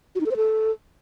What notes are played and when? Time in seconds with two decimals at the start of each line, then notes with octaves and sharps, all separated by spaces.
0.15 F#4
0.21 D#4
0.26 A4
0.31 C5
0.36 A4